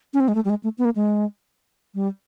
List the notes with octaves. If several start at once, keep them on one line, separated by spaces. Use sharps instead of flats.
C#4
C4
G#3
A3
G3
G#3
A3
B3
A#3
G#3
G3